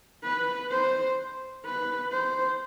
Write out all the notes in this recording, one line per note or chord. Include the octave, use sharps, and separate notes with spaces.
B4
C5
B4
C5